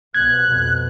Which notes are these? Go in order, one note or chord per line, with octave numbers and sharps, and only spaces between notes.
C2 B2 F#6 G#6
F2 B2